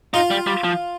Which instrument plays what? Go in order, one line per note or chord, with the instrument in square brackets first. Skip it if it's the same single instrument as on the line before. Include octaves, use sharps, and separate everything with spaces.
[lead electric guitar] D#4 [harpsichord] F4
[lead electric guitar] G3
G3
F3